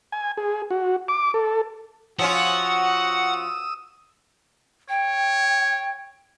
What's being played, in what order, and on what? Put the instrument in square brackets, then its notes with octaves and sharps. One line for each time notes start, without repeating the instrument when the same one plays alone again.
[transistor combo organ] G#5
G#4
F#4
D6
A4
[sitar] F3 C#4 F4 [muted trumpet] F#4 [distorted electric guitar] F#5 [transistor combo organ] D#6 E6
[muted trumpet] C#5 [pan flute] G5